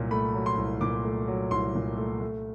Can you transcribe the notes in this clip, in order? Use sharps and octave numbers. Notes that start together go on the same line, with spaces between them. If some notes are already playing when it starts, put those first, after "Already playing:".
Already playing: C2 A#2 F#3
A3 B5
F#3
C6
C2
A#2 D6
A3
F#3
C2 C6
A#2
A3
A3